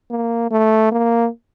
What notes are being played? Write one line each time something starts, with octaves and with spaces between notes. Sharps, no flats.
A#3
A3
A#3